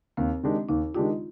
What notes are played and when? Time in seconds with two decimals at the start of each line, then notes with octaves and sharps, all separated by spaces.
0.17 D#2 C4
0.43 D#3 G#3 D4 G4
0.69 D#2 D#4
0.95 D#3 G#3 D4 F4 G4